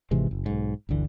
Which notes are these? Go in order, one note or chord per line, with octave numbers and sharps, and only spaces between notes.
G#1 C3 E3 G#3
F#1
B1 G#2
G1 D2 D3 E3